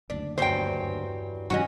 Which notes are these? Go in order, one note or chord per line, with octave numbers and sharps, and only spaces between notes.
F#1 D2 D4
E2 G2 F#3 C5 G5
F#2 D#3 F#3 G3 C#4 F#4 D#5